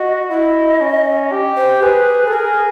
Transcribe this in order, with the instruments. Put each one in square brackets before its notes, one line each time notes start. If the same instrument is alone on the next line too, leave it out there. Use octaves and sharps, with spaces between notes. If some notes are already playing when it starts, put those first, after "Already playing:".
Already playing: [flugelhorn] F#4 [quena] D#5
[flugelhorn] E4 [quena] D#5
[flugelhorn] C#4
G4
[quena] C5
[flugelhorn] G#4 [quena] B4
[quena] A4
[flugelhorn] G#4 [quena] A#4